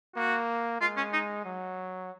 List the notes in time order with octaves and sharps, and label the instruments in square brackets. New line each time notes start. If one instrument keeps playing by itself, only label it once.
[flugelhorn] A#3 [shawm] F#4
[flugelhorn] G#3 [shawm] F4
[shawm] C#4
D#4
[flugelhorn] F#3